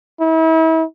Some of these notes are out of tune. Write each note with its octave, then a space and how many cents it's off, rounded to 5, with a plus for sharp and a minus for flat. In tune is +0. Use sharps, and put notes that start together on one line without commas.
E4 -35